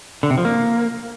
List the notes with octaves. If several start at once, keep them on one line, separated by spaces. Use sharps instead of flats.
D3
C3
F3
A#3